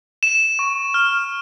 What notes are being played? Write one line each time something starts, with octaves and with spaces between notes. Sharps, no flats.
E7
C#6
F6